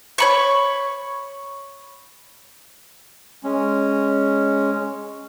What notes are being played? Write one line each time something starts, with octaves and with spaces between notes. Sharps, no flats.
C#5 B5 C#6
G#3 C#4